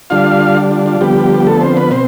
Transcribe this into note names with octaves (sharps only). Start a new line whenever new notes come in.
D3 G3 D4 F4 F5
F4
F4
D3 F3 G3 B3 G4
A3 A4
C4 C5
B3 B4
B2 C4 C5